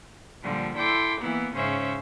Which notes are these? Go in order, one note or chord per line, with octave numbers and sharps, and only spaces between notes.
A#2 D3 F3 G3
E4 A4 G5 C6 D6
E3 A#3 B3 E4
G#2 C#3 C#4 C5 E5